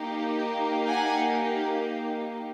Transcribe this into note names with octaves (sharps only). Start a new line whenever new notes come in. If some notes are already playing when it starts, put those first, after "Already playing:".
Already playing: A#3 D#4 G4
F#5 G#5